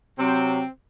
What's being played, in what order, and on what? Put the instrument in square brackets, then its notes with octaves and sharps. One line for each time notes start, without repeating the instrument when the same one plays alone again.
[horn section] C3 F#3 C4